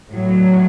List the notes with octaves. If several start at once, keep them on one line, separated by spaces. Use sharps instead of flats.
A2 F#3